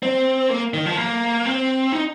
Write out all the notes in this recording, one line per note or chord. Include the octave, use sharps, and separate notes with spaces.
C4
A#3
D#3
F3
A#3
C4
D#4